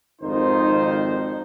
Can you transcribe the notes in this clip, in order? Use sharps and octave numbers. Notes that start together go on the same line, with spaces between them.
G#1 F2 D#3 D#4 C5